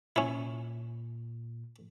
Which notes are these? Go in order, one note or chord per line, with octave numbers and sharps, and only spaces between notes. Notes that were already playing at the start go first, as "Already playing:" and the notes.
A#2 C#4 E4